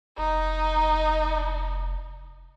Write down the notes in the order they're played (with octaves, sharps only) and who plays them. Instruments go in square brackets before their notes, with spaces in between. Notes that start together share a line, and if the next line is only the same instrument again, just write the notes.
[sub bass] F1 [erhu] D#4